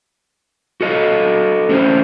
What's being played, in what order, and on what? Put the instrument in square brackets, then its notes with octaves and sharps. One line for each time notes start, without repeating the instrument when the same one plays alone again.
[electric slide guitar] F#4 A4 D#5
A3 C#4 G4 C5